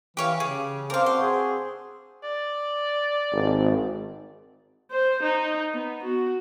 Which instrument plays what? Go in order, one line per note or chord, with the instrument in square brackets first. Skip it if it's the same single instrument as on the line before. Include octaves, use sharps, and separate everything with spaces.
[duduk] E3 [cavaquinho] G4 C#5 F5
[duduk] C#3 [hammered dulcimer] G4 [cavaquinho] G#4
[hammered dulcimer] C4 D4 D5 [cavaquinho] A#4 F5 [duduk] C5
[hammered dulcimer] C4 F#4 [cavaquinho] C6
[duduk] G#4
[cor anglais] D5
[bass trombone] G#1
[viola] C5
D#4
B3
F#4